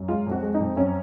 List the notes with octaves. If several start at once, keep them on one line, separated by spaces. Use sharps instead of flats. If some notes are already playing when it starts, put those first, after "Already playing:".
Already playing: F#2
G#3 F4
F2 F#4
G#3
D#4
F2
F#2 C#4